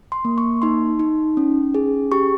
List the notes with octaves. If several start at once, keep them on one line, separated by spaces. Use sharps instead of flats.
C6
A#3
C#6
D#4 C6
D#4
C#4
G#4
G4 C#6